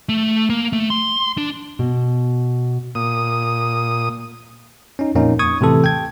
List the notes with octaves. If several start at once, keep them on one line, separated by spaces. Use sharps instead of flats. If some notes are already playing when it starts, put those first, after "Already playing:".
A3
A#3
A3
C6
D4
B2
A#2 D#6
C#4 D#4
F2 A#2 A#3 C#4 D#4
C#6 D#6 G#6
A2 C3 E3 A4
G5 G#6